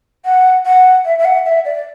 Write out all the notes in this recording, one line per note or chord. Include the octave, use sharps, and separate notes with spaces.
F#5
F#5
E5
E5
F#5
E5
D5